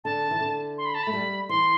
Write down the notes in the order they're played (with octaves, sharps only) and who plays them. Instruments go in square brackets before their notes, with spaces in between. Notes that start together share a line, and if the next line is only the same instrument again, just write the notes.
[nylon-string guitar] D3 [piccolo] A5
[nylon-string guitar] E3
D3
[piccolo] C6
B5
A5
[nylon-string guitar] A3 [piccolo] B5
[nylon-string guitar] G3
[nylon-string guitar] E3 [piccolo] C6